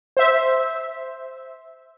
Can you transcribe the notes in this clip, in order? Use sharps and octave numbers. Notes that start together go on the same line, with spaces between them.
C5 E5